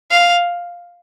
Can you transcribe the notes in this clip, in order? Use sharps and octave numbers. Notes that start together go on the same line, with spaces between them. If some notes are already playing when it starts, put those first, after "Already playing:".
F5